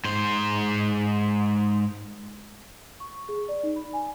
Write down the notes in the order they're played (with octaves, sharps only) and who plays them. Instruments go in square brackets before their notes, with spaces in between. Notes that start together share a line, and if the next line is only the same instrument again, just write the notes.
[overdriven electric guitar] G#2 C5
[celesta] C#6
G#4
D5
D#4
B5
G#5